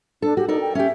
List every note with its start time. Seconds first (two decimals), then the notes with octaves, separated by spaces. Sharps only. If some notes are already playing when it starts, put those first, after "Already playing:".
0.22 D4 A4
0.37 F#4 G4
0.48 D#4 A4 A#4 D5
0.61 G5
0.75 C#4 G4 E5